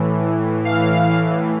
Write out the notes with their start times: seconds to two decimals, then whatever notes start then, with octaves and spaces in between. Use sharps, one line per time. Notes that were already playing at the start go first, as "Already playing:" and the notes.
Already playing: A2 E3
0.65 F5